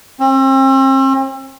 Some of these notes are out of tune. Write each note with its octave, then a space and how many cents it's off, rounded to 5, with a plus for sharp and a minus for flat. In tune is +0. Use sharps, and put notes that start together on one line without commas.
C4 +40